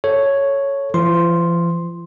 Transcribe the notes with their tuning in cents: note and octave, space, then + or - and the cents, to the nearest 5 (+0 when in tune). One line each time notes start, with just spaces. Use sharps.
A4 +0 C#5 +0
F3 -45 C6 +0